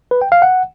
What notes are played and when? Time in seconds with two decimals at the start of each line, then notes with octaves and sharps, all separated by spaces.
0.11 B4
0.22 G5
0.32 F5
0.42 F#5